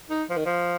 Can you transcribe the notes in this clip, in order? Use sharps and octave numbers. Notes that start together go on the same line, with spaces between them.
D#4
F3
D#3
F3